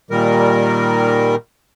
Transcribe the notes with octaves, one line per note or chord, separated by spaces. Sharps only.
A#2 D#3 G3 A#4